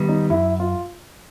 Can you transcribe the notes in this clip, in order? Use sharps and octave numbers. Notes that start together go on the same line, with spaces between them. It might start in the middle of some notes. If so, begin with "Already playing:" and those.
Already playing: D#3 G3 B3
D#4
F#2 E4
F4